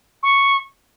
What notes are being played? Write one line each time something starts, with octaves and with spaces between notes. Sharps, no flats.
C#6